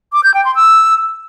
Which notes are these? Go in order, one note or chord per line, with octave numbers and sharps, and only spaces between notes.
D6
G6
G5
C6
E6